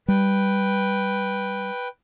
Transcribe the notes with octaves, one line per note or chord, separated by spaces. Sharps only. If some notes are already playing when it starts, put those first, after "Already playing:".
G3 B4 G5